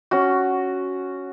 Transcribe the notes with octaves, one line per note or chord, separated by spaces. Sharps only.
C#4 F#4